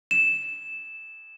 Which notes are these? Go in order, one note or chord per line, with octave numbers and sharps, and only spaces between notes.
E7